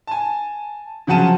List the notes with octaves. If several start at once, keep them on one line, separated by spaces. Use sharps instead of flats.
G#5 A5
C#3 F3 F#3 F#5 A5 D#7